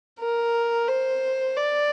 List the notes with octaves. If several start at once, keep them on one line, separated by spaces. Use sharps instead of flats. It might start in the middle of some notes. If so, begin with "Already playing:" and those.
A#4
C5
D5